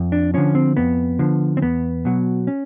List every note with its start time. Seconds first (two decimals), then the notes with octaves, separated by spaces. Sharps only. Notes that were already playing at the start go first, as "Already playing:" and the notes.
Already playing: F2
0.12 D4
0.34 D3 F3 C#4
0.55 C4
0.77 F2 B3
1.19 D3 F3
1.57 C4
1.62 E2 B3
2.05 B2 F#3
2.47 C#4